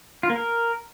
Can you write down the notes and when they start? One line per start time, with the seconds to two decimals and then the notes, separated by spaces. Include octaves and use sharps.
0.23 F4
0.30 A#3
0.36 A#4